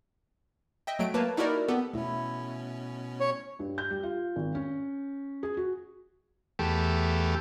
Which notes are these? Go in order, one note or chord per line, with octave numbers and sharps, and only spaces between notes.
D#5 E5 G5
F#3 A3 D7
A#3 B4 C#5 A5
D#4 E4 F#4 G4 A#4 D5
B3 G4 A4
B2 A3 C#4 E4
C#5
G2
G6
G3
F4
G#1
C#4
G#4
F#4
E2 A3 G4